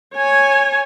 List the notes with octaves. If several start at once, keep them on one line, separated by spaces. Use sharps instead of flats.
C#5 G#5